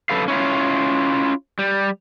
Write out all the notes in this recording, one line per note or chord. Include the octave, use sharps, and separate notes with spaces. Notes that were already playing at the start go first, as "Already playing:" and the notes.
F#2 A4 B4 F5
C#4 E4 F4
G3